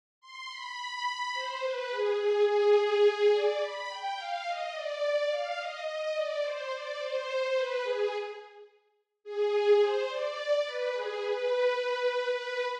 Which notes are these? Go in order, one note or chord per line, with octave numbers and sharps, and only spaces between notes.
C6
B5
C5
B4
G#4
G#4
G#4
D5
B5
G5
F5
D#5
D5
F5
D#5
D#5
D5
C5
D5
C5
B4
G#4
G#4
C5
D5
B4
G#4
B4
B4